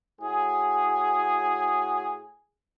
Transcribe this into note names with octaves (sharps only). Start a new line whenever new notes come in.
A2 F#4 G#4